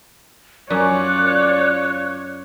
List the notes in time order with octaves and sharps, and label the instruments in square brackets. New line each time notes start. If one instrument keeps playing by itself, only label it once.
[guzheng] F#2 [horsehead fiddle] F4 C#5 [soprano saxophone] D5 [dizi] F#6